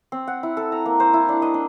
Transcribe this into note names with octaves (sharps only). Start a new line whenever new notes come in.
C4
F#5
E4
A4
A#5
A#3
C5
E4
D4
D#5
D4